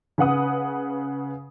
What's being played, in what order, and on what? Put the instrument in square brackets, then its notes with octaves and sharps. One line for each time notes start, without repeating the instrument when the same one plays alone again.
[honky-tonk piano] C#3 B4 F#5 D#6